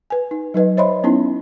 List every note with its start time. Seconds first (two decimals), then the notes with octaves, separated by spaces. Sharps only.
0.10 B4 G#5
0.31 D#4
0.54 F#3 D#4 B4 D#5
0.77 C5 C#5 D#5 E5 B5 C6
1.04 B3 C#4 D#4 E4